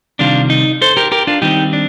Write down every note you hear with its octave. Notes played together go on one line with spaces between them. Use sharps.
C3 D#3 G3 D4 F4
D#4
A4 C5
G4 A#4
G4 A#4
D4 F4
D#3 G3 C4 D#4 G4
D4